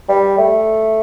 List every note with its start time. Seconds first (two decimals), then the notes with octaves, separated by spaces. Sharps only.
0.09 G3
0.38 A3